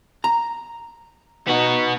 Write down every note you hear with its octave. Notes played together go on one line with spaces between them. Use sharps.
A#5
B3 D#4 F#4